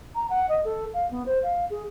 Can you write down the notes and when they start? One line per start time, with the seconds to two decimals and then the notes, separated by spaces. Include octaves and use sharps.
0.15 A#5
0.30 F#5
0.49 D#5
0.65 A4
0.94 F5
1.11 B3
1.26 C5
1.43 F5
1.70 G#4